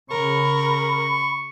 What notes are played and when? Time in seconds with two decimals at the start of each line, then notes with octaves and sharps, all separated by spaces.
0.10 C#3 A#4 B5 C#6